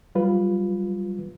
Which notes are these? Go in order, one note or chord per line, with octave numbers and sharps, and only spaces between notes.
F#3 G3 F4 B4